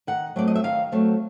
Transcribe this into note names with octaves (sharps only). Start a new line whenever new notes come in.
D#3 F#5
F#3 A3 C4 D5
D#5
E5
D#3 F5
F#3 A3 C4